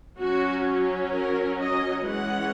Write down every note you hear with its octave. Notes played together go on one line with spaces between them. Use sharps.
F#3 C#4 F#4
A#4
D#5
E3 G#3 C#4 F#5